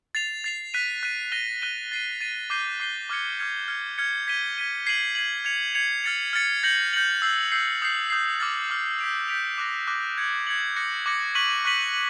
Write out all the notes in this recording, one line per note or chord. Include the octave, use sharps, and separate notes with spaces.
A6 C7 F7
A6 C7 F7
F#6 B6 D#7
F#6 B6 D#7
F#6 A#6 D#7 G7
F#6 A#6 D#7 G7
A6 C7 D#7
A6 C7 D#7
D6 G6 C7 D#7 G7
D6 G6 C7 D#7 G7
D6 F6 G#6 C#7
D6 F6 G#6 C#7
F6 G#6 C#7
F6 G#6 C#7
G#6 B6 D#7 G7
G#6 B6 D#7 G7
G#6 C7 D#7 F#7
G#6 C7 D#7 F#7
G#6 C#7 F7
G#6 C#7 F7
F6 A6 C#7
F6 A6 C#7
G6 A#6 C#7 F#7
G6 A#6 C#7 F#7
E6 G6 C7
E6 G6 C7
D#6 G6 C7
D#6 G6 C7
D6 F6 A6
D6 F6 A6
G6 B6 D7 F7
G6 B6 D7 F7
D6 F#6 A#6
D6 F#6 A#6
G#6 C#7 F#7
G#6 C#7 F#7
D6 F#6 A#6 C#7
D6 F#6 A#6 C#7
C#6 F#6 B6 D#7 F#7
C#6 F#6 B6 D#7 F#7
F#7